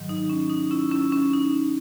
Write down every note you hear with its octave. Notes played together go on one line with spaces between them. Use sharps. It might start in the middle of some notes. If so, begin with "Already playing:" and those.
Already playing: G#2 D#3 F#3
D#4
C#4
D#4
C#4 E4
C#4 E4
C#4
D#4